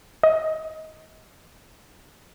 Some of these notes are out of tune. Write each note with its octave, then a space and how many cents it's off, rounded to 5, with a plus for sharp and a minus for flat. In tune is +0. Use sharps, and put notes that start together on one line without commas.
D#5 +25